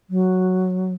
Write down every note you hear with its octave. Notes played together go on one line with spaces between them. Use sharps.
F#3